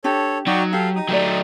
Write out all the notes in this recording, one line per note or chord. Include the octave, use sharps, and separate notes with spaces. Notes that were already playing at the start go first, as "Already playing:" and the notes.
D4 G4 A4 C#5
F#3 D#4 F#4 D5 G5
G4 A4 F5
D#4 D#6
F#3 A3 D5 G5